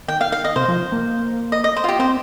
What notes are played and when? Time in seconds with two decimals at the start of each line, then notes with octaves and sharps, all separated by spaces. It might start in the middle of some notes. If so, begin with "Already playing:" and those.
0.08 D#3 G5
0.21 F5
0.32 F5
0.44 D#5
0.56 C3 C5
0.68 F3
0.92 A#3
1.52 D#5
1.64 D#5
1.77 C5
1.84 F4
1.89 G4
1.99 C4 C5